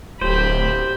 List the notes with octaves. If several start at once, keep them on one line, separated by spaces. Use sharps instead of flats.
D1 G4 C5 B5